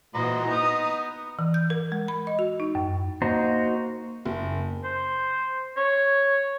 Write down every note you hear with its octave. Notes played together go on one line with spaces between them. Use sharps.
A#2 E3 F#4 C5 D#5 A#5
B3 D#4 A#5 D#6
E3
G6
A#4
G#3
B5
D#5
F#4
D#4
F#2
A#3 D#4 F#4 C5
F#1
C5
C#5